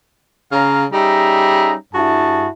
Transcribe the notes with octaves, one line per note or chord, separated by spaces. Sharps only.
C#3 F5 A#5
G3 C#4 D#4 G#4 E5 A#5
G2 E4 F#4 G#4 A5